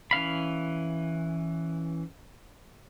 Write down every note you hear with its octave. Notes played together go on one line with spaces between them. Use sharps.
E3 C#4 F5 B5